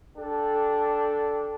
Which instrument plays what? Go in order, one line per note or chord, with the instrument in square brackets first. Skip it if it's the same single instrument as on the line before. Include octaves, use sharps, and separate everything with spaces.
[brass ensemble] D4 G4 A4